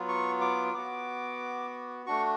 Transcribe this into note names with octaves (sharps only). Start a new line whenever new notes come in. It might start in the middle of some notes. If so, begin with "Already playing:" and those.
Already playing: F#3 B3 F4
C#6
D6
B3 F#4 D6
A3 D4 F#4 C#6